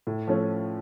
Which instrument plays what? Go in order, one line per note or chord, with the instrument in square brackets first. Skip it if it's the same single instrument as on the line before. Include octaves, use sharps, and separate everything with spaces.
[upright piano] A2
F3 A3 C#4